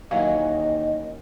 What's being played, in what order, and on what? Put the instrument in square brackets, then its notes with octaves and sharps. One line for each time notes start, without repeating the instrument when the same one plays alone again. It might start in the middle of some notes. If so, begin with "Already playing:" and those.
[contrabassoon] D#2 [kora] E3 F#3 C#4 [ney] D#5 [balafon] F5